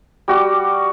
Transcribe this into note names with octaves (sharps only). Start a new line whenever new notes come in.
G3 F#4 D6